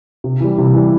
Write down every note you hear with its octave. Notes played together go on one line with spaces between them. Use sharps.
C3
E3 G3
C3
E3 G3